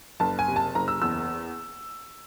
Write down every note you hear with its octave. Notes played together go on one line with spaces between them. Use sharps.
F#1 A5
G#5
C3
A5
F#1 A#5
E6
E2 E6